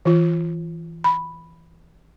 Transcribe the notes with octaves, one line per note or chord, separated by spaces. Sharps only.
E3 F4
B5